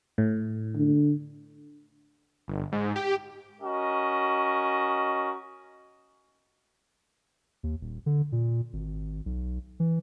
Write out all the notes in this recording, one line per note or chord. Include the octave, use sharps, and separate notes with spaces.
A2
D3
G1
G#2
G4
C#4 F#4 A#4 D#5
D#2
D#1
D3
A#2
G#1
B1
E3